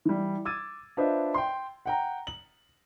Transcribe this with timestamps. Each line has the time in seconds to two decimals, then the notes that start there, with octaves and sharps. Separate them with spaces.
0.05 E3 G3
0.45 D6 E6 G#6 A6 D#7
0.97 D4 F4 B4 C5 D#5 E5
1.34 G5 C6
1.86 F#5 G5 A#5
2.27 F#7